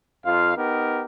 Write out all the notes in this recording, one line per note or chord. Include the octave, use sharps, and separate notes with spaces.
F2 F4 F5
B3 D#4 G4 A#4